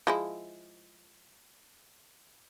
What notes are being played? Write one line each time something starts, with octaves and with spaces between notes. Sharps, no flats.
F3 G#3 E4